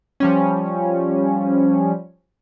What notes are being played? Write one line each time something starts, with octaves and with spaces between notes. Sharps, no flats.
F3 G3 C#4